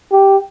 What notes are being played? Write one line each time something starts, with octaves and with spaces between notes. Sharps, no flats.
G4